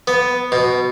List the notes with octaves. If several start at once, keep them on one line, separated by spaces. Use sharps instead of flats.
B3
B2